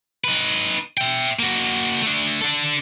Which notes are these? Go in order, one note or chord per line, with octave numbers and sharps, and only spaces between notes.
D#4 B4
E5 G5
A#3 F#4
A3 D4
D4 A4